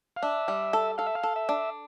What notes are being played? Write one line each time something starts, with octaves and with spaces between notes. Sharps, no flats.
F5
D4 E5
G3
A4
A4 F5
E5
F5
A4
E5
D4